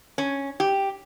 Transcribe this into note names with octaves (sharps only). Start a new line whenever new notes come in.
C#4
G4